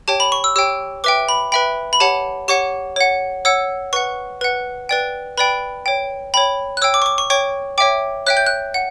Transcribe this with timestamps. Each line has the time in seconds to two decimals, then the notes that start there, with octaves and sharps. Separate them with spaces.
0.08 G4 C#5 G5 A5
0.20 B5
0.32 C#6
0.44 E6
0.56 G4 C#5 G5 E6
1.04 B4 E5 G5 D6
1.29 B5
1.52 B4 E5 G5 B5
1.93 B5
2.00 G4 C#5 F#5 A5
2.48 G4 C#5 F#5 C#6
2.96 C#5 F#5
3.45 C#5 F#5 E6
3.93 B4 F#5 C#6
4.41 B4 F#5
4.89 B4 D5 G5
5.37 B4 D5 G5 B5
5.86 C#5 G5
6.34 C#5 G5 B5
6.77 F#6
6.82 C#5 G5 E6
6.94 D6
7.02 C#6
7.06 D6
7.18 C#6
7.30 C#5 G5 C#6
7.78 C#5 E5 G5 D6
8.26 C#5 E5 G5 F#6
8.37 G6
8.46 F#6
8.74 F#5